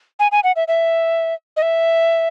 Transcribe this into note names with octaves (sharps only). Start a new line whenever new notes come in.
G#5
G#5
F#5
E5
E5
D#5
E5